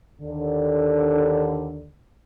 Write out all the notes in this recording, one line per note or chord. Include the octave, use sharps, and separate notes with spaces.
D#2 D3